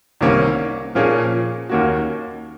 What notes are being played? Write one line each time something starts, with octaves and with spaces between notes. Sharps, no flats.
C2 C3 D#3 A#3 C#4
A#2 F3 A#3 C#4 G#4
D#2 D#3 A#3 C#4 F#4